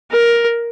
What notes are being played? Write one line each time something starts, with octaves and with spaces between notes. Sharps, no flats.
A#4